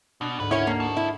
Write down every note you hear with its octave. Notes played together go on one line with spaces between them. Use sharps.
B2 D4
D2 G#2 B4
C#4 E4 A#4 C#5 F#5
A#3
C5 A5 C#6
E4